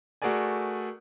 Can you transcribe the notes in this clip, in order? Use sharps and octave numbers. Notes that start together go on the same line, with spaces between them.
A3 F#4 G#4 A#4 D5 G#5